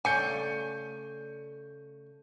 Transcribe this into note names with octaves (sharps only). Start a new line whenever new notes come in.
C#3 A3 A4 D5 G#5 G6 C#7 D#7